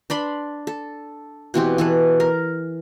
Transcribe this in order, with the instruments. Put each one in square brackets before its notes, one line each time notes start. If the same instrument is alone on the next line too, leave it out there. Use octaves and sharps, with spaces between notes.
[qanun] D4 D5 B5 C6
A4
B2 E3 C4 G4
E3 A4 B4
A#4